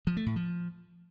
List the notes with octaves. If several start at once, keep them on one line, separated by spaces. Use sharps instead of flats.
F3
A3
A2
F3